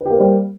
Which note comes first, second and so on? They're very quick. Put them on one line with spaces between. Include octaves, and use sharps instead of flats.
B4 G4 A#3 C5 G3